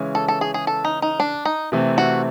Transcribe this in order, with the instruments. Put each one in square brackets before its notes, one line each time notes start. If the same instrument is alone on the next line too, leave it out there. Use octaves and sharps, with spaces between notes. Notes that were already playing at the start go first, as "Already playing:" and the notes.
Already playing: [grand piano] C#3 E3 G#3 C#4
[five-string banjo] A4
A4
G#4
G#4
A4
D#4
D#4
D4
D#4
[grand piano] C3 E3 A3 C4
[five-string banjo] F#4